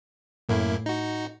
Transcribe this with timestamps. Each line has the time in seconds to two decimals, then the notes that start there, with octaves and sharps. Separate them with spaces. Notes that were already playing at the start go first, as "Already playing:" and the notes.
0.49 F#2 A2 A#3 E4
0.86 D#4 F#4